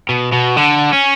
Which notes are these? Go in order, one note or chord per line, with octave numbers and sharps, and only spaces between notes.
B2
B2
D3
C#4